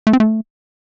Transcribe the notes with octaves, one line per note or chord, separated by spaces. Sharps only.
A3
C4
A3